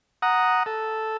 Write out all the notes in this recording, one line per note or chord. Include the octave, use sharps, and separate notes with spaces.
F#5 A#5 D#6
A4